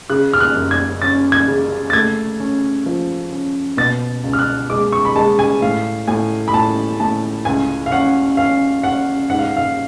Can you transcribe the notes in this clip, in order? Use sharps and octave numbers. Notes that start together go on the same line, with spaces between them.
C#3 F#6
F6
F#6
F#2
G#6
C#4 A6
G#6
C#3
A6
A3 G#6
C#4
F3
C#4
B2 A6
C#2
F6
F#6
G#3 D6
C#6
B5
G#3 A5
G#5
A2 F5
A2 G#5
B5
A2 A5
A2 A5
C#2 G#5
F5
C#4 F#5
C#4 F5
C#4 F#5
G#2 F#5
F5
F5